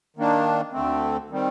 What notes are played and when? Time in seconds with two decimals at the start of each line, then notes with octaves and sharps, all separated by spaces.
0.17 D#3 A#3 D4
0.72 D2 D3 A3 C4
1.30 D#3 G3 C4